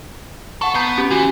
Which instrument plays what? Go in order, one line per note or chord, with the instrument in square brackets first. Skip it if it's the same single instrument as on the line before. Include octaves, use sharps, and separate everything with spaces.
[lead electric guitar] A4 [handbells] F#5 C#6
[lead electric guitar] B3 [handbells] A#5 G6 C7
[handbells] C#4 G4
[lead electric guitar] E3 [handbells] F#4